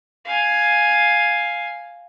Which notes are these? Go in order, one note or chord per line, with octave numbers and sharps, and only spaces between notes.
F5 G#5